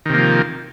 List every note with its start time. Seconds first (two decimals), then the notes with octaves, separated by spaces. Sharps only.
0.05 D#3
0.10 C3
0.14 A#3
0.18 F3